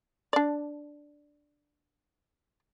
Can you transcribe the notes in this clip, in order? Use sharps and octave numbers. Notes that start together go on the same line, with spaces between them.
D4 D5